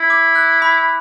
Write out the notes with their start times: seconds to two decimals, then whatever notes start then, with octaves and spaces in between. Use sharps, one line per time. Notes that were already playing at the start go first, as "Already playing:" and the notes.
Already playing: E4
0.10 D6
0.35 F#6
0.62 B5